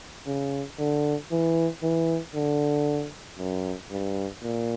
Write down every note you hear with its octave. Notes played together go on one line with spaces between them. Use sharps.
C#3
D3
E3
E3
D3
F#2
G2
A#2